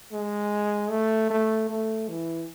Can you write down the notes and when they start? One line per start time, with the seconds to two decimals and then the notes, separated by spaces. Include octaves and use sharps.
0.12 G#3
0.90 A3
1.30 A3
1.69 A3
2.09 E3